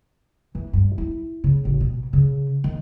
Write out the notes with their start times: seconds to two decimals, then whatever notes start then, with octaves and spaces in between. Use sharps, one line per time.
0.55 E3
0.73 G2
0.98 E4
1.44 C#3
1.65 A1
1.80 B2
2.13 C#3
2.64 D#3